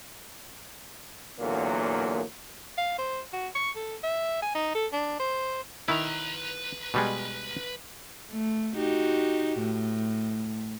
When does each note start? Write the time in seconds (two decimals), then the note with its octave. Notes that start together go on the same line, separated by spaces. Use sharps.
1.39 E2 A#2 D3 F#3 A#3
2.78 F5
2.98 C5
3.33 F#4
3.55 C#6
3.76 A4
4.03 E5
4.42 G#5
4.55 D#4
4.75 A4
4.93 D4
5.20 C5
5.88 D#3 E4 B4 A#5
6.94 B2 G3 G#3
8.31 A3
8.76 D#4 F#4 G4
9.59 A2